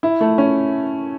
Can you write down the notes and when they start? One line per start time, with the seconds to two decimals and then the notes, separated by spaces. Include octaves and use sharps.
0.03 E4
0.21 A3
0.38 C#4